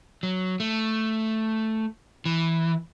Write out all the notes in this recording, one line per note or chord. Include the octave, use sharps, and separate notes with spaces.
F#3
A3
E3